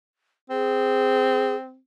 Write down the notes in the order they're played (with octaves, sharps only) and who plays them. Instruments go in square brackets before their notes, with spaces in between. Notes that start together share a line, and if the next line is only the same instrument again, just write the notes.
[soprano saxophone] C4 [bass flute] G#4